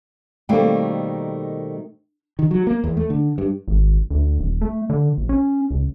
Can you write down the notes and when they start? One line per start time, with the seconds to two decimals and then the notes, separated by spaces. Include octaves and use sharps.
0.49 B2 D#3 G3 A3 A#3 C4
2.39 D#3
2.51 F#3
2.67 A#3
2.84 E2
2.97 A3
3.10 D3
3.38 G2
3.68 G#1
4.11 D2
4.40 D#1
4.61 A3
4.90 D3
5.18 A#1
5.29 C#4
5.71 C#2